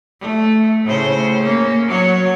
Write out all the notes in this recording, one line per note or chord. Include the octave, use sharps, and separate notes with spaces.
A3
A2 C#3 C5
A#3 C#4
F#3 C#5